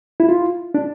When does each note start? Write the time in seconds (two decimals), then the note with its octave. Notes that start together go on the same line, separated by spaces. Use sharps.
0.20 E4
0.29 F4
0.74 D4